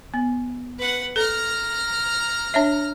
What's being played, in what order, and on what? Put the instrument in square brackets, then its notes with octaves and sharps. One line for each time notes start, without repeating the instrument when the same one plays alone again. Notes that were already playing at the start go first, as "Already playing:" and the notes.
[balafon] B3
[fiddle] B4 F#5
[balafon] A4 [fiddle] A#5 F6
[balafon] D4 C#5 E5